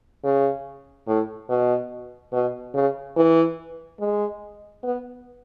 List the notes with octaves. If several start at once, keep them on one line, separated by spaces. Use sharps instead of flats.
C#3
A2
B2
B2
C#3
E3
G#3
B3